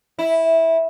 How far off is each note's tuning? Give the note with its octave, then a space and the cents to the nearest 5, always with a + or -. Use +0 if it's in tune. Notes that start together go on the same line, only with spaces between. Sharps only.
E4 -10